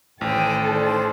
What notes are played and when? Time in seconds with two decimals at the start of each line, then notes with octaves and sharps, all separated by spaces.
0.21 A1 D#3 A4 C5 G5 G#5
0.69 C5 D5